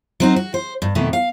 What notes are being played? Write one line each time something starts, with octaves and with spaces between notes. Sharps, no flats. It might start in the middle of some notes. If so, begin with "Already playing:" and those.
F#3 C4 D#4
F#4
C5
G2
F2 B2 D#3 A3
F5